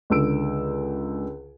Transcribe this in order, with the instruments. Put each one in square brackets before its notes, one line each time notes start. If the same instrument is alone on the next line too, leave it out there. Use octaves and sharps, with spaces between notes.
[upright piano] C#2 D3 E6 D7